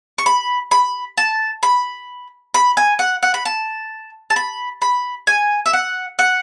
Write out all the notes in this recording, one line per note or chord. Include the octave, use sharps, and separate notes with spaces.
C#6
B5
B5
A5
B5
B5
G#5
F#5
F#5
B5
A5
A5
B5
B5
G#5
E5
F#5
F#5